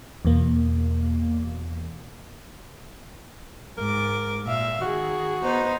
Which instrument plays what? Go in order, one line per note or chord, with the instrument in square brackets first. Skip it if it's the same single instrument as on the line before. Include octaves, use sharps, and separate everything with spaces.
[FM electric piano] E2 B2 A#3
[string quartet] G#2 D6 [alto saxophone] A#4
[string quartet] A#2 E5 F5
[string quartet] D#3 G#4 [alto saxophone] F#4
[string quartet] B3 D#4 C5